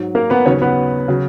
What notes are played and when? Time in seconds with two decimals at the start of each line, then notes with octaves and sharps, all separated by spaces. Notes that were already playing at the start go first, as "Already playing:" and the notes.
Already playing: G#2 F#3
0.15 A#3 A#4
0.30 B3 B4
0.46 D#2 C#3 F#3 C#4 C#5
0.62 B3 B4
1.08 C#3 F#3